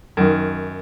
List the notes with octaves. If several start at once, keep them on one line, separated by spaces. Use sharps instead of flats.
F#2 D#3